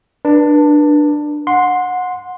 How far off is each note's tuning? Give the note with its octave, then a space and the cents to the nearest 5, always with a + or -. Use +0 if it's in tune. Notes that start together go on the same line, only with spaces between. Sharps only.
D4 +15 B4 -30
F#5 -25 C6 +0